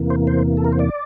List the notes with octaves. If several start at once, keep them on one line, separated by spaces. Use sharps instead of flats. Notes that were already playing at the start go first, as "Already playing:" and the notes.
Already playing: E2 C3 E3 A#3
C5
C5
A4
A#4
C5
D5